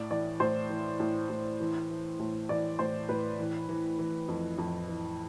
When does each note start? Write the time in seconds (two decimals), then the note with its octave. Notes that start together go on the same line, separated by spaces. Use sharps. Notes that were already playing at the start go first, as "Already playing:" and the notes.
Already playing: A2 D5
0.11 E3 D5
0.40 A2 C5
0.70 E3
1.00 A2
1.30 A2
1.60 E3
1.89 E3
2.19 A2
2.49 E3 D5
2.79 A2 C5
3.09 A2 B4
3.39 E3
3.69 E3
3.99 E3
4.28 F2
4.58 F2
4.88 E3